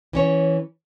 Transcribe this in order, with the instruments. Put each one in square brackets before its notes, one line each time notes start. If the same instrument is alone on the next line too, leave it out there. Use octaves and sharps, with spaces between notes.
[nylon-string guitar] E3 C#4 C#5